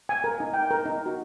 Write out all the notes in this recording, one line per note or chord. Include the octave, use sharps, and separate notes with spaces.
G#5
A#4
D#4
G5
A#4
D#4
F#4